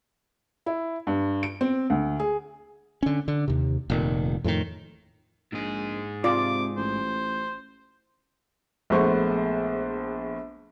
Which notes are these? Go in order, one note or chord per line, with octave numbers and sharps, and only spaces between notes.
E4
G2
D7
C4
D2
G#4
D3 C#4
D3
D#2 C3
F1 A#2 D#3
F2 A2 C3 D#3
A#1 G#2 G#4
C3 F4 D5 D6
A1 C5
A#1 G#3 A3 B3 C5 C#6